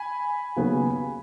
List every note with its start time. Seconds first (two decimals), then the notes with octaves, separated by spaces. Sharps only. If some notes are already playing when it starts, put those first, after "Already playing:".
Already playing: G#5 B5
0.56 D#2 C#3 F#3 B3